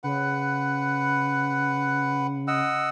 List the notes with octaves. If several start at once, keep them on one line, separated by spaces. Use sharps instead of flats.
C#3 B4 F#5
D#5 F#5 E6